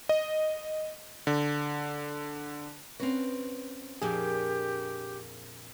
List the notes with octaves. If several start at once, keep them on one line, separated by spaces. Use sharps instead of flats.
D#5
D3
C4 C#4 F#4 B4 F5
F2 A#2 A#3 D4 G4 G#4